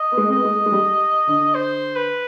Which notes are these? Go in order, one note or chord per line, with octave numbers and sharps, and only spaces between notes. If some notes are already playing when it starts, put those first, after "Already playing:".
Already playing: D#5
B3
G#3
C4 D#5
B3
G#3
G#3
G3
D3
C5
B4